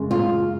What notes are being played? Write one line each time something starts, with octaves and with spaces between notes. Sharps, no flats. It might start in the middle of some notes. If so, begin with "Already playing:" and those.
Already playing: F#2 C#3 G#3
F4